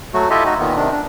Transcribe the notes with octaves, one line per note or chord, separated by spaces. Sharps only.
F#3 A3 F#4
E4 F4 G4 A4 D#5 E5
D#4 F#4
A#2 D#3 B3
C3 D#3 D4
D4